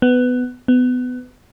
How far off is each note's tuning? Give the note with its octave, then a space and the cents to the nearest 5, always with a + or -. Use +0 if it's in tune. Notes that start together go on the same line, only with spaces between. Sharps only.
B3 +15
B3 +25